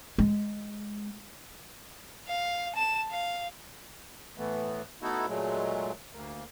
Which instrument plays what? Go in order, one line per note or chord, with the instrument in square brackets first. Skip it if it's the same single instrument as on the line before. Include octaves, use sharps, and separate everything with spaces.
[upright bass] G#3
[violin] F5
A5 E7
F5
[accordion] A2 E3 A3 B3
A3 B3 D#4 E4 F#4 A4
A#2 F#3 G#3 A3
D2 A#3